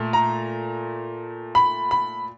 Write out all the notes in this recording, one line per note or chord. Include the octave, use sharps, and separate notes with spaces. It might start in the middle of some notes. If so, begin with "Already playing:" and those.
Already playing: A#2 A3
A#5
B5
B5